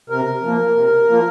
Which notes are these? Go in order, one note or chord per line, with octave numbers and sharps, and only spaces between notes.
C3 A#4
F3 A#3
C3
F3 A#3